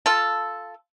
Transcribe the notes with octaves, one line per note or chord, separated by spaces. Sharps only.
F4 A4